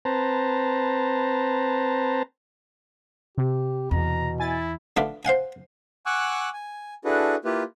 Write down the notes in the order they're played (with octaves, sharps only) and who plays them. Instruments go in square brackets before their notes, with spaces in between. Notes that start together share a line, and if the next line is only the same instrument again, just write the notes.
[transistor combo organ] C4 B4 C5 A5 A#5
[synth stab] C3 [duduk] G4
[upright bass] E2 [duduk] B2 [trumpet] A#5
[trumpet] E4 [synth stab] G#5 A6
[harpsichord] D3 A3 F4 B4 D6
C5 F5 F#5 G#5
[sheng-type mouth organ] F#5 G#5 C#6 D6 E6 F#6
G#5
D4 E4 F#4 G#4 A4 B4
A#3 E4 F4 G4 B4